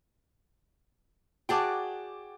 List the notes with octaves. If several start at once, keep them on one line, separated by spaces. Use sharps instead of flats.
F#4 G#4 D5 G5 A5 D6